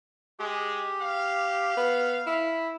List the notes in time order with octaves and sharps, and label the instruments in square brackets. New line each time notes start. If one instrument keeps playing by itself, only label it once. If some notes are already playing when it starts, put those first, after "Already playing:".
[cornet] G#3 [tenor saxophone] G4
[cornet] F5
[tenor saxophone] B3
E4